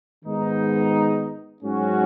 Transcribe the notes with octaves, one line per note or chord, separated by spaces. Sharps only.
G#2 D#3 G#3 B3 D#4
G#2 F#3 C#4 F#4